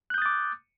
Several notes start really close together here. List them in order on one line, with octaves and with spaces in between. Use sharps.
F#6 G6 D#6 A6 D6